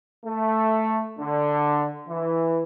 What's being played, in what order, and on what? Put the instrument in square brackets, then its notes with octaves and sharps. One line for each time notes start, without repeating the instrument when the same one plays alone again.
[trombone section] A3
D3
E3